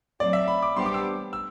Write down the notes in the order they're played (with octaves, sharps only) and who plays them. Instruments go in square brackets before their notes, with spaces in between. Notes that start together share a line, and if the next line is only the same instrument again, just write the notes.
[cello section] F#3 A3 C4 [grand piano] D5
[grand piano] E5
B5
D6
[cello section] G3 B3 D4 G4 C5 [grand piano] C6
[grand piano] D6
E6
E6